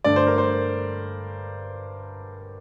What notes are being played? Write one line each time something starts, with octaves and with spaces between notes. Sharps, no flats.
G2 D3 A3 D4 D5
C5
A#4
C5